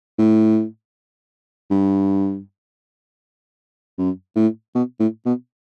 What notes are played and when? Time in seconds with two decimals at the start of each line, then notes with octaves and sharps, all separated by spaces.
0.18 A2
1.70 G2
3.98 F#2
4.36 A2
4.75 B2
4.99 A2
5.25 B2